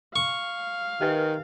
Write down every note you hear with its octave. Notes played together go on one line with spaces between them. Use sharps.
F5 C#6
D#3 G4 A#4 B4